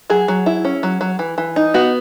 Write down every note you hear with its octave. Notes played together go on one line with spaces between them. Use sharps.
F#3 G#4
F#3
E4
C#4
F#3
F#3
E3
E3
D#4
B3 F#4